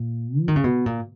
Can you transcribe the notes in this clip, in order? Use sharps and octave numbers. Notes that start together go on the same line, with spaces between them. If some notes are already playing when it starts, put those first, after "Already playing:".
Already playing: A#2
F3
D#3
C#3
B2
A#2